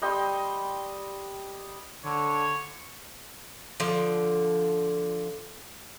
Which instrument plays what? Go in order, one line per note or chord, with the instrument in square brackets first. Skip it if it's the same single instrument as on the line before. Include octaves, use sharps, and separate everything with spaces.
[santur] G3 D#5 G5 C6
[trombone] D3 [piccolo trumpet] C#5
[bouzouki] D3 F3